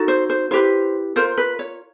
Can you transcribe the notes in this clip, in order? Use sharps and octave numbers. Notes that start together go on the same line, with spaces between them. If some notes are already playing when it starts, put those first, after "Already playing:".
Already playing: D#4 F#4 A4
C5
C5
E4 G4 B4 C5
F4 A#4 C5
B4
C#5